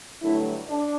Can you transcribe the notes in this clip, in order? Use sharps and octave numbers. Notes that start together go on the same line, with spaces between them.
G2 D3 F#3 A3 E4
D4